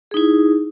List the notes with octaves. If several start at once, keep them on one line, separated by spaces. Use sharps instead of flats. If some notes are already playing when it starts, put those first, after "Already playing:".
D#4 E4 G#4